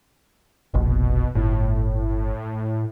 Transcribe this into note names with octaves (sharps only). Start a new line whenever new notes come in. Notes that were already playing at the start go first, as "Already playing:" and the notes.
F1 A#1 B2
G1 A2